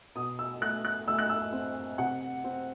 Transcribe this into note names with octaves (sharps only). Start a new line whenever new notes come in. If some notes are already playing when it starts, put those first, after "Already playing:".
B2 D#6
E6
A3 F#6
F#6
A3 E6
F#6
E6
C4
C3 F#5
C4